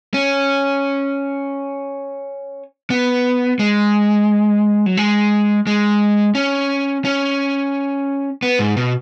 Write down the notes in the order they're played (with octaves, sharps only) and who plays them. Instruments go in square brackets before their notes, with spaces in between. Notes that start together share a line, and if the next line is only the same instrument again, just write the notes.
[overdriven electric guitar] C#4
B3
G#3
F#3
G#3
G#3
C#4
C#4
B3
G#2
B2